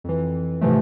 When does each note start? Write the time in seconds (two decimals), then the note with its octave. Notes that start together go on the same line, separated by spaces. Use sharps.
0.04 F2 E3
0.61 G#2 C3 E3 F3 A3